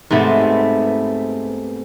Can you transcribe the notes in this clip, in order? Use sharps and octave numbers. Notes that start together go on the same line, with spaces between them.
G#2 C3 A3 B3